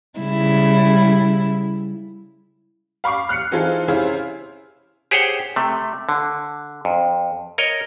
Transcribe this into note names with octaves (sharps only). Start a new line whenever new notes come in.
C#3 G3 E4
F5 B5 C#6 D6 C7
F6 F#6 C7 C#7
E3 C4 D#4 F4 G#4 A4
C3 C#4 E4 G#4 C5 F5
G4 G#4 C5 C#5 F#5 G5
C3 A3
D3
F2
A#4 C#5 D#5